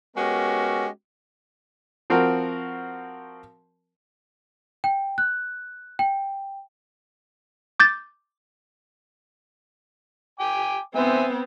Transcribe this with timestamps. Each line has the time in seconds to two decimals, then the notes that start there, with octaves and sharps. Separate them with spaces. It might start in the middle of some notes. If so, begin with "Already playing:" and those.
0.17 G#3 B3 C#4 F#4 G4 A#4
2.10 F3 C4 F#4 A#4
4.84 G5
5.18 F#6
5.99 G5
7.80 D6 G6 A6
10.40 G5 G#5 D6
10.95 B3 C4 C5 E5 G#5